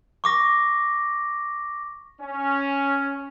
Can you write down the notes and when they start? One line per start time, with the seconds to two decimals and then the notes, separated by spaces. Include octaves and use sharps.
0.24 C#6 D6 A#6
2.19 C#4